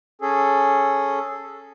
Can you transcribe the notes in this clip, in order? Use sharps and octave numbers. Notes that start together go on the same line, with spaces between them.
C#4 G#4 A4